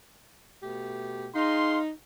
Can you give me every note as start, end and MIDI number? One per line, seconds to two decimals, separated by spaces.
0.63 1.27 47
0.63 1.27 57
0.63 1.27 67
1.34 1.91 63
1.34 1.79 68
1.34 1.79 77
1.34 1.79 84